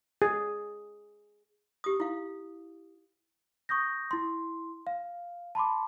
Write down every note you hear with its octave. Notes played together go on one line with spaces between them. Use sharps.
G#4
G4 D#6
E4 F5
C#6 D#6 G6 A#6
E4 C6
F5
A5 B5 C6 D6